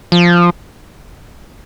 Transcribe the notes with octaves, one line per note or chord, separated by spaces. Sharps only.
F3